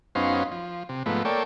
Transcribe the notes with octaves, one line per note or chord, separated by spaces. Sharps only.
F#2 B3 C#4 D#4 C5 F5
F3
C3
G#2 F3 A3 B3
A#3 A4 C#5 D5 G5